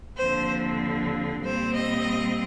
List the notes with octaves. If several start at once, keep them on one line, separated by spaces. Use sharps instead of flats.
D#2 D3 F3 C4 C5
A#2 G3 C4 C5
D#5